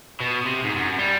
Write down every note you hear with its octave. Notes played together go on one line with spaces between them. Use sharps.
B2
C3
G#2
F#2
G3